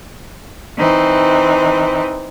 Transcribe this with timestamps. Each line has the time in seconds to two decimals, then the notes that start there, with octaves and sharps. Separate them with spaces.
0.77 E3 C4 D#4